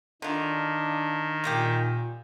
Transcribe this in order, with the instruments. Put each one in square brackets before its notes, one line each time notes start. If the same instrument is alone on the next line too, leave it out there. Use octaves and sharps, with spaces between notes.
[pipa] D3 F4 [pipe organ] D#3 [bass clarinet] D4
[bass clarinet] A#2 [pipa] G#3 A#3 G4